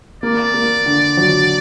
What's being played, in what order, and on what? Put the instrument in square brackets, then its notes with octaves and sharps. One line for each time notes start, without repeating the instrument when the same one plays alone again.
[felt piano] A#3 [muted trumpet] D5
[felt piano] A#3
D3
F#3